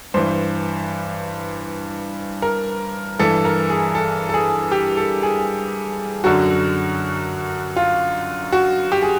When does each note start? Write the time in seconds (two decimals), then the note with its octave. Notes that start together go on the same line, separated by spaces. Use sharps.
0.14 G2 E3 C5
2.42 A#4
3.19 G2 E3 A4
3.45 A#4
3.70 G#4
3.95 A4
4.29 A4
4.34 G#4
4.72 G4
4.97 A4
5.23 G#4
6.24 F#2 D3 F#3 F#4
7.76 F4
8.52 F#4
8.92 G4
9.02 G#4